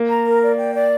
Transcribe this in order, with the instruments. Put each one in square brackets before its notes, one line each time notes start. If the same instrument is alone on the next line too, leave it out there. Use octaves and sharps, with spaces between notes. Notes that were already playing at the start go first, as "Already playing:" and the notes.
Already playing: [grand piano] A#3
[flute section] A#5
A#4
D5
G5
D5